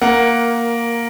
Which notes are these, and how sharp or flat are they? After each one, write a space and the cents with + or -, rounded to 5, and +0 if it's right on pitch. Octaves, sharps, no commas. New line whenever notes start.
A#3 +0 A#4 +15 F#5 +0